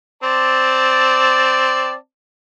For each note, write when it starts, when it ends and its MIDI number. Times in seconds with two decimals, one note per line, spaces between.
0.23 1.94 60
0.23 1.94 74
0.23 1.94 81